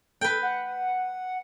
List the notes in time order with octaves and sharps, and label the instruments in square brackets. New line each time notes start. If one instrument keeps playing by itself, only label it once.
[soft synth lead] A4 [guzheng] B4 G5
[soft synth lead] F#5